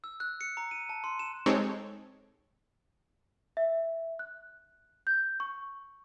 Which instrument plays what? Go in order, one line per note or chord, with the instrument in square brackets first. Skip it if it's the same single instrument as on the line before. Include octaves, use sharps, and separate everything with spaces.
[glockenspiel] E6
F#6
C#7
A#5
D#7
A5
C6
E7
[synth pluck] G#3 C4 D#4 G4 A4 C#5
[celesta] E5
F#6
G6
C#6